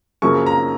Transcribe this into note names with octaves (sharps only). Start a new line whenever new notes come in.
F#2 C#3 F3 A#3 C#6
A#5